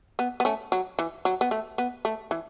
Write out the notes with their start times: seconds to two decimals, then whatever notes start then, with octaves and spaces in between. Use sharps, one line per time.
0.19 B3
0.40 B3
0.45 A3 C#4
0.72 F#3
0.99 E3
1.25 F#3
1.41 B3
1.51 A3
1.78 B3
2.05 A3
2.31 E3